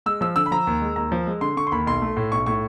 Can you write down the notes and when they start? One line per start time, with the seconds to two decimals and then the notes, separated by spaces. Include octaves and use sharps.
0.06 G#3 E6
0.21 F3 E6
0.36 D3 E6
0.46 B5
0.51 F3 A#5
0.67 D#2
0.82 G#3
0.96 D#2 A#5
1.12 F3
1.27 G#3
1.41 D3 C6
1.57 D3 C#6
1.67 C6
1.72 D#2 B5
1.86 B1 C6
2.02 A3
2.17 A2
2.32 B1 C#6
2.46 A2 C#6